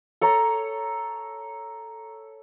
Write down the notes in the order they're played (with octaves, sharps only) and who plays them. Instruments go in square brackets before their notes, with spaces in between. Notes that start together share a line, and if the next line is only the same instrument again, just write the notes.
[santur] A4 C#5 A#5